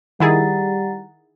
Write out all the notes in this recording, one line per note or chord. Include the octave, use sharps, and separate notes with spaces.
D#3 G3 E4 G#4 F#5 A#5 A6